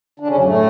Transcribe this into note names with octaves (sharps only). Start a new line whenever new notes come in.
D3 D4
C#3 C#4
F#2 F#3
A2 A3